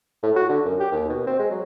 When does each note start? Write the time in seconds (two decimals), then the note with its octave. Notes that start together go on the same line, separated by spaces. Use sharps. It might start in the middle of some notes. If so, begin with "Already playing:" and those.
0.23 A2
0.36 F#4
0.49 D3
0.66 F#2
0.80 G4
0.92 D#2
1.09 B2
1.27 C4
1.39 G#3
1.51 F#3